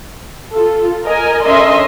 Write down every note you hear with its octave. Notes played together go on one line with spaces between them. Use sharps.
F4 A4
A#4 D#5 G#5
D3 C#4 A#4 D#5 E5 C6